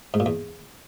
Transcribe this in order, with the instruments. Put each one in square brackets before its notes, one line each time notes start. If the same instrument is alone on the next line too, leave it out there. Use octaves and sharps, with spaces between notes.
[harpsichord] G#2
A#2
E2